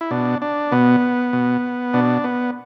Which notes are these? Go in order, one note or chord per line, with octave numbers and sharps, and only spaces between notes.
E4
B2 D4
D4
B2 B3
B2
B2 D4
B3